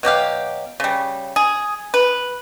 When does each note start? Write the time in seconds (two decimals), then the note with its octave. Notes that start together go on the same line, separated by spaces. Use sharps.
0.03 B2 F#3 G4 F5
0.80 C#3 G3
1.36 G#4
1.94 B4